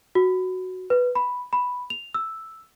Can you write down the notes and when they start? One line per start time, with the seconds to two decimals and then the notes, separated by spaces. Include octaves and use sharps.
0.15 F#4
0.90 B4
1.15 B5
1.53 B5
1.90 F7
2.14 E6